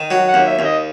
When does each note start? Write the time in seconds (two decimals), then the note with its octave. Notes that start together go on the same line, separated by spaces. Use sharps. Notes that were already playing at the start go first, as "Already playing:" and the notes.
Already playing: D#3
0.10 F#3 F#5
0.28 F#5
0.34 D#2
0.47 E5
0.59 D#2
0.65 D#5